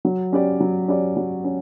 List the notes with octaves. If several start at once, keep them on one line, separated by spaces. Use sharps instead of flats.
F#3
C#4 G4 D5
F#3
C#4 G4 D5
F#3
C#4